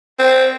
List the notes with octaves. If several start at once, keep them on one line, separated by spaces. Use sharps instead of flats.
C4